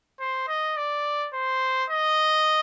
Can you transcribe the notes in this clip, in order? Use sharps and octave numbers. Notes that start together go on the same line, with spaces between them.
C5
D#5
D5
C5
D#5